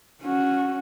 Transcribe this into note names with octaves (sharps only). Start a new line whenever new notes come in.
C#4 F#4